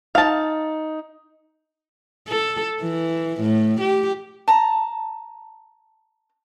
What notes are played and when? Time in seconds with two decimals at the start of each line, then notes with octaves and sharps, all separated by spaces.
0.15 D#4 F5 A5
2.28 A4
2.82 E3
3.41 A2
3.81 G4
4.48 A5 A#5